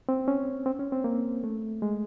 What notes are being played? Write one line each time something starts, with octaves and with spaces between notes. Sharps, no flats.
C4
C#4
C4
C#4
C4
A#3
A3
G#3